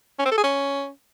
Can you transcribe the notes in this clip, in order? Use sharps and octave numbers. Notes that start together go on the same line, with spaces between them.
C#4
C4
A4
G#4
C#4